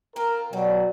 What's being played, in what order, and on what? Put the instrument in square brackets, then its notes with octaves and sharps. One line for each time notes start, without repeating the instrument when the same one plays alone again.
[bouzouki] C4 F4 [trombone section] A#4
[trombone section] B2 F#3 [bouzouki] G3